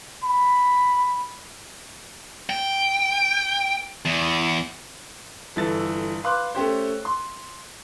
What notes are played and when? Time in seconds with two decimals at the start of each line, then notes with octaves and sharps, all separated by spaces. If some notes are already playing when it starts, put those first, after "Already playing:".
0.24 B5
2.50 G5
4.05 E2
5.56 G1 E3 A4 A6
6.24 B4 F5 C6 D6 F#6
6.55 A3 C#4 G4 C5
7.05 C6